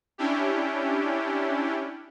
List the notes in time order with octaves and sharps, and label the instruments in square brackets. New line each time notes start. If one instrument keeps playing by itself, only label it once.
[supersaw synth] C#4 D4 E4 G4